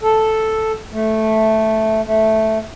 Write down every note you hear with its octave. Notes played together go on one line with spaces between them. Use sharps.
A4
A3
A3